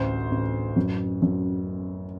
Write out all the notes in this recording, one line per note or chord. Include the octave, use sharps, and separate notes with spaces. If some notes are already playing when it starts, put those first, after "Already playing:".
Already playing: A1 D2 C5
A1
F#2
F#2